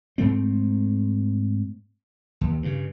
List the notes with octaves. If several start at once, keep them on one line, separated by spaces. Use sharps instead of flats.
G#2 A3 C4
D#2
G2 C#3